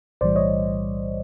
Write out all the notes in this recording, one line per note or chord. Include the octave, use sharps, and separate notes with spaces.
B1 A2 E3 G3 C5 D5
C#5 D#5